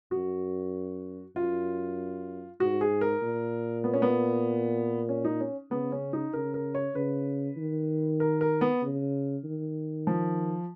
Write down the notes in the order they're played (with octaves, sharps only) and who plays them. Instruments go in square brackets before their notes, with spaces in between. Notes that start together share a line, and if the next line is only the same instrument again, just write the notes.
[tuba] F#2 [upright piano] F#4
[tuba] F#2 [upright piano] F4
[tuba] G#2 [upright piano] F#4
[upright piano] G#4
A#4
[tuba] A#2
[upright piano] B3
C#4
B3
C#4
D#4
C#4
[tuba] C#3 [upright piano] B3
[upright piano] C#4
D#4
[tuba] C#3 [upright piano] A#4
[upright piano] A#4
C#5
[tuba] C#3 [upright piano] B4
[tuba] D#3
[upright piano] A#4
A#4
B3
[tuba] C#3
D#3
[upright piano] F3